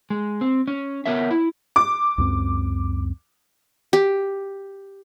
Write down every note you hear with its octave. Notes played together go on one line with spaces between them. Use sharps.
G#3
C4
C#4
B3 A#4 C#5 E5
E4
D6
C#2 F#2 C4
G4